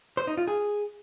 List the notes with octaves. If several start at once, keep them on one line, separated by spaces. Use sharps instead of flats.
C5
D#4
F4
G#4